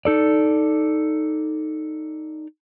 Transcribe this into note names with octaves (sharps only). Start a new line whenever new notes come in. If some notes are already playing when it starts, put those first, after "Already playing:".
D#4 A4 D5